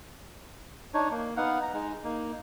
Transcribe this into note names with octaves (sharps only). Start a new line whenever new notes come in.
D4 D#4 C#5
A#3
B3 D#4 F5 F#5
A#5
G#3 D#4
A#3 D#4